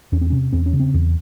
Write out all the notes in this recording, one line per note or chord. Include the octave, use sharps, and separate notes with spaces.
E2 C#4
C4
C3 C#4
E2 C4
C#4
C#3
C4
E2